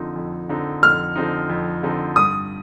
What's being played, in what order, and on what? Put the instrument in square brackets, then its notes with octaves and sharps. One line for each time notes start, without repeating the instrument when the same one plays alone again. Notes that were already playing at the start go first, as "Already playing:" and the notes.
Already playing: [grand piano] F2 D3 F3 C4 D#4
F2
D3 F3 C4 D#4
[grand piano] F2 [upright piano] F6
[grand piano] D3 F3 C4 D#4
F2
D3 F3 C4 D#4
[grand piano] G2 [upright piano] D#6